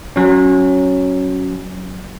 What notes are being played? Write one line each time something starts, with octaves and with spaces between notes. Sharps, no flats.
F#3 C#4